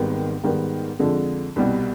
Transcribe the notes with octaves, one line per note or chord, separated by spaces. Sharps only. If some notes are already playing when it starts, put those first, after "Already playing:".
Already playing: G#1 G#2 D#3 G3 B3
G#2 D#3 G3 B3
F2 D3 F3 G#3
C2 B2 G3